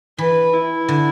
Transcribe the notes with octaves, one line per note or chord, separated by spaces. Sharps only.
E3 B4
E4
D3